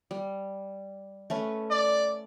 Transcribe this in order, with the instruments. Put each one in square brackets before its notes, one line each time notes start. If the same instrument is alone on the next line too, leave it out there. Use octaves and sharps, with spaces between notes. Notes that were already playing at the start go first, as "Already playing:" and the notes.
[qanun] G3
A3 C#4 B4
[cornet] D5